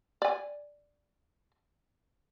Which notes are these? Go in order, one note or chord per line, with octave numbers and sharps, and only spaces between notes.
D5 G#5